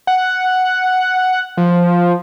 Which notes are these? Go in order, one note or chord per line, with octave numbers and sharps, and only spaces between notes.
F#5
F3